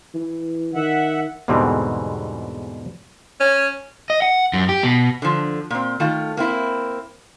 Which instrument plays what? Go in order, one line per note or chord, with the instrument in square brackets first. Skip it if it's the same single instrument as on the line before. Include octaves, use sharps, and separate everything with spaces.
[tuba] E3
[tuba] D#3 [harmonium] E5 F#5
[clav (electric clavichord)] E2 G#2 B2 D3 G3 C4
[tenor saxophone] C#4
[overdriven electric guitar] D#5
F#5
F#2
G4
B2
[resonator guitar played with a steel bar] D3 F3
A#2 C4
D#3 A3 F4
A#3 C4 E4